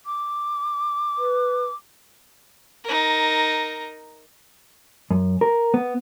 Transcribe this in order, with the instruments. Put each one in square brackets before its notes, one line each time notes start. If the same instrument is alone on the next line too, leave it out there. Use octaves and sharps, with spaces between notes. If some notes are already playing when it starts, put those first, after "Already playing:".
[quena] D6
[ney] B4
[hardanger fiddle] D#4 A#4
[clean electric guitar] F#2
A#4
B3